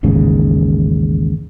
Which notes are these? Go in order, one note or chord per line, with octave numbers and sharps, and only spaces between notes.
A1 D#2 G#2 C#3